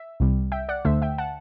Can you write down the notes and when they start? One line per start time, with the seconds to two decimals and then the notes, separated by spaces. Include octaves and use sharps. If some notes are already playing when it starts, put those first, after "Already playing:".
Already playing: E5
0.20 C2 C3 G3
0.52 E5 G5
0.69 D5 F#5
0.85 D2 D3 A3 C5 E5
1.02 E5 G5
1.18 F#5 A5